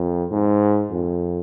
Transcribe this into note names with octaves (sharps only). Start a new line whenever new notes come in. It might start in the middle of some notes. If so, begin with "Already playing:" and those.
Already playing: F2
G#2
F2